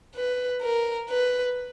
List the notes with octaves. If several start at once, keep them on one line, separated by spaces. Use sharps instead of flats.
B4
A#4
B4